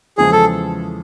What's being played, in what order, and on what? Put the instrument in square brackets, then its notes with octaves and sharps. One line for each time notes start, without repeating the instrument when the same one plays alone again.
[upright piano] E2 C#3 F3 G#3 [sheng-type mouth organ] G#4
[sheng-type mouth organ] A4